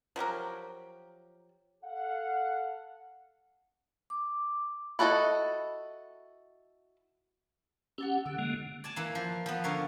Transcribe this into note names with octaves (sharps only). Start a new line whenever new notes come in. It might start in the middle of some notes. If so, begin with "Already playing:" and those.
F3 F#3 G4 A#4
A4 F5 F#5
D6
E4 F#4 A4 D5 D#5
C#4 F#4 G4 A5 E6
D3 E6
D3 G#3 A#3
D5 G#5 A5
E3 A#3
F3
F3 B3
D3 A#4 C#5 F5